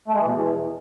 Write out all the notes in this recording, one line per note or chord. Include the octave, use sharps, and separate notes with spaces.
A3
G#3
E3
B2
E2